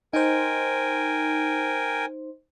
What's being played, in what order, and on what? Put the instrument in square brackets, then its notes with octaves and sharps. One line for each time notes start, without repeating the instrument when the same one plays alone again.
[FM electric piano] D#4 C5 [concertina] A#4 G5 G#5